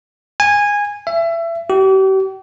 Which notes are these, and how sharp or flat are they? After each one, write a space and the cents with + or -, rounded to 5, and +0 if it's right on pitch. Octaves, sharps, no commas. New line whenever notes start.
G#5 -15
E5 +25
G4 -40